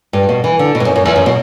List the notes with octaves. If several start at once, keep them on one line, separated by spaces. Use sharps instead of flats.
G2
B2
E3
D3
B2
G2
F#2
F#2
E2
F#2
B2